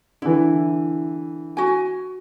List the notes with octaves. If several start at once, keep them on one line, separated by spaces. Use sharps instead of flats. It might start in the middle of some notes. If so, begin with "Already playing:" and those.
D3 E3 E4
F#4 G#5